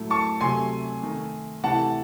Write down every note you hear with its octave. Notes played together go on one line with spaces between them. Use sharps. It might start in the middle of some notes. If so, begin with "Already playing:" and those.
Already playing: A2 F#3 A3
A5 C#6
C3 F#3 A3 G#5 C6
D#3 A3
C3 E3 A3 F#5 A5